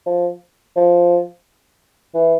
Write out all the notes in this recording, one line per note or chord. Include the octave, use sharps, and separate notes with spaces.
F3
F3
E3